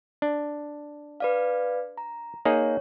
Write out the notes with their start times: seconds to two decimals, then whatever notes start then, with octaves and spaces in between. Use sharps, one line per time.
0.22 D4
1.20 B4 D5 F5
1.98 A#5
2.45 A#3 D#4 G#4 C#5